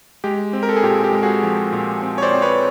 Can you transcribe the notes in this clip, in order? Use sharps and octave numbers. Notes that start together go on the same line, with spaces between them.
G#3 G4
C4
A#4
A4
G#4
A#2 G4
G4
G#3
F#4 G#4
F3
A#2
C4
C#5
C5 D5
C4
B4 C#5